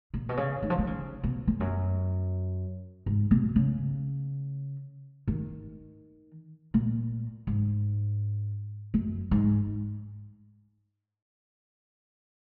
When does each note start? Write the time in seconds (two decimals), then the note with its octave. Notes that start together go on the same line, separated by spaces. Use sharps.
0.14 A#2
0.29 B2
0.37 C#3
0.63 D#3
0.70 F3
0.79 D#3
0.87 C#3
1.24 B2
1.47 F2
1.60 F#2
3.06 G#2
3.31 B2
3.56 C#3
5.28 D#3
6.74 A#2
7.47 G#2
8.94 F#2
9.31 G#2